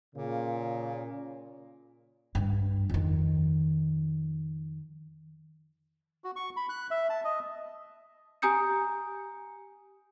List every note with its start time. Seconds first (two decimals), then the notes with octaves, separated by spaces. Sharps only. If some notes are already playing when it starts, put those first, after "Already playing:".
0.15 A#2 C#3
2.35 G2
2.90 F2 D#3
6.24 F#4
6.36 C#6
6.57 B5
6.69 F#6
6.91 E5
7.10 A5
7.24 D#5
8.42 G4 G#5 A#5 D#6 G6 C#7